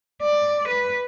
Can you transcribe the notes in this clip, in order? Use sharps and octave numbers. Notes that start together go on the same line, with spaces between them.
D5
B4